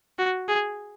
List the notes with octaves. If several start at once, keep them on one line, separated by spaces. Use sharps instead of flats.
F#4
G#4